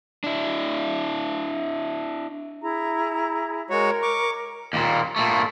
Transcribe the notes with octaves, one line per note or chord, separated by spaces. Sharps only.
D4 E4
E4 G#4 A#5
G#3 F#4 A#4 C#5
C#6 D6
D#2 A#2
A#2 A3